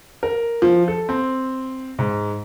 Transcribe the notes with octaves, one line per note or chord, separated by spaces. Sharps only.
A#4
F3
A4
C4
G#2